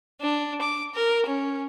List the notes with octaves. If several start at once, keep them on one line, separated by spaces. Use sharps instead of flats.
D4
D6
A#4
C#4